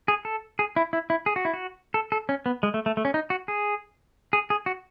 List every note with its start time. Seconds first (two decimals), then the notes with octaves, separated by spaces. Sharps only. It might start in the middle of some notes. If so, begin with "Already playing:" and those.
0.08 G#4
0.25 A4
0.59 G#4
0.76 E4
0.93 E4
1.10 E4
1.26 G#4
1.36 F#4
1.45 E4
1.54 F#4
1.94 A4
2.12 A4
2.29 C#4
2.46 B3
2.63 G#3
2.74 A3
2.86 A3
2.97 A3
3.05 C#4
3.14 D#4
3.30 F#4
3.48 G#4
4.33 G#4
4.50 G#4
4.66 F#4